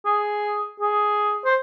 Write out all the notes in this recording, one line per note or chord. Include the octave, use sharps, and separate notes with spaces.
G#4
G#4
C5